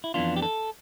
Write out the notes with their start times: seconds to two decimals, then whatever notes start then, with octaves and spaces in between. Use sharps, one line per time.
0.04 E4
0.14 F2 E3 B3 D4 F4
0.36 G4
0.42 A4